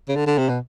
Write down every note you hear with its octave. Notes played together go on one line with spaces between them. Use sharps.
C#3
D3
D3
C3
B2